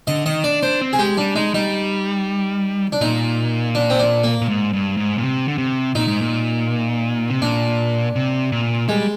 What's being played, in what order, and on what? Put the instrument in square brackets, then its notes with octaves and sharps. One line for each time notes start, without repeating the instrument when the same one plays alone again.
[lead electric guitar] D3 [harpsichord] D#5
[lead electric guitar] D#3 [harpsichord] D#5
[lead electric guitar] D4 [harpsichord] D5
[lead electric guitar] D4 [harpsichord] C5
[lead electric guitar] C4
[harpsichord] G#4
[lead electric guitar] G#3 [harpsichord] G4
[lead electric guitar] G3 [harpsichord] D4
[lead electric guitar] G#3 [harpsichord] D#4
[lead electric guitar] G3 [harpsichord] D#4
[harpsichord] D4
[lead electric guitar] A#2 [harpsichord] D#4
[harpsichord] D4
C4
D4
A#3
[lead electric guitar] A#2
G#2
G2
G#2
A#2
C3
D3
C3
[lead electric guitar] A#2 [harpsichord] D#4
[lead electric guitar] G#2
A#2
C3
[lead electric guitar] A#2 [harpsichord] D4
[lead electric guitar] C3
A#2
[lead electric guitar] G3 [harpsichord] G#3